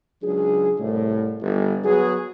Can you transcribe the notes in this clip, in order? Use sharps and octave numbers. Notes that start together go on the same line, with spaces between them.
C#2 F#3 D4 G#4
C2 A2
G1
F#3 B3 F#4 G#4